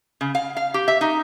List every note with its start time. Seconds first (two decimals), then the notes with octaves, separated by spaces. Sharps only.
0.21 C#3
0.35 F5
0.57 F5
0.74 G4
0.88 E5
1.01 D#4